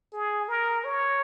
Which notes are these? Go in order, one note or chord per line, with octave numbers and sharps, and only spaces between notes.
G#4
A#4
C#5